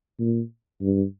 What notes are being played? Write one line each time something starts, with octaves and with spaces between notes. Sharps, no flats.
A#2
G2